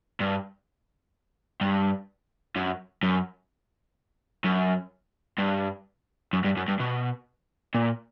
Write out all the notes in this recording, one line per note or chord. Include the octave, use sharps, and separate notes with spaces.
G2
G2
F#2
F#2
F#2
G2
F#2
G2
F#2
G2
B2
A#2